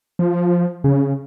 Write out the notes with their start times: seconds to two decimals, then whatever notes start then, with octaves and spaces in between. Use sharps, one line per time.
0.19 F3
0.84 C#3